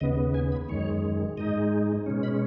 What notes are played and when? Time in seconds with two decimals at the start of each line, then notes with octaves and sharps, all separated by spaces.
0.01 D#2 C#3 B3 D#5
0.34 G#5
0.52 B5
0.69 F#2 D#3 G#3 C#5
1.38 G#2 G#3 D#4 D#5
2.06 B2 G#3 C#4
2.23 B5